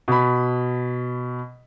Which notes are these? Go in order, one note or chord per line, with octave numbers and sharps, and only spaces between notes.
B2 B5